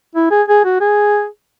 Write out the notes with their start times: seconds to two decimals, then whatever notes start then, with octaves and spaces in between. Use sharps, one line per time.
0.15 E4
0.31 G#4
0.48 G#4
0.65 F#4
0.80 G#4